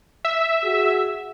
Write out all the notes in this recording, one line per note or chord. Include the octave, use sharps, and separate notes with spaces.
E5
F#4 G#4